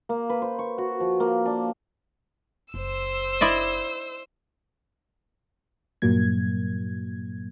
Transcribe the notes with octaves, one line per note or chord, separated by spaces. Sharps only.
A#3
B4
C5
C#6
F#4
F3
A#3
D4
F#1 C5 E6
E4 D5 D#5
G2 A#2 F#3 A#3 G#6